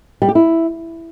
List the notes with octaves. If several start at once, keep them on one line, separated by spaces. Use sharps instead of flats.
G3
G4
E4